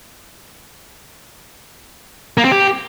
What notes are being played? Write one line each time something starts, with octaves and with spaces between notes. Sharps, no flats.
A#3
C4
G4